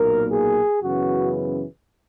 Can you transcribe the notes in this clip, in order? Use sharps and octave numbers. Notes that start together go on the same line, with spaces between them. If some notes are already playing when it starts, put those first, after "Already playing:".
Already playing: B1 A#2 A#3 A#4
G#4
F#2 C#3 E3 B3 F#4